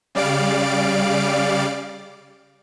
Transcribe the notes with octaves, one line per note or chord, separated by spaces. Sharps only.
C#3 G3 D5 F5 D7